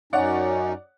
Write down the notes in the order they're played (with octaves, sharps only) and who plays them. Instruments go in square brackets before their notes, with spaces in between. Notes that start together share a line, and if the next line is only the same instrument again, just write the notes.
[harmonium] F#2 C#4 D#4 [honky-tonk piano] C#5 D5 F#5